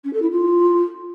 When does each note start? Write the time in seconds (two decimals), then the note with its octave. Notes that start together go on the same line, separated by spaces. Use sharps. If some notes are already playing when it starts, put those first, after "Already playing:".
0.04 C#4
0.13 A4
0.22 E4
0.30 F4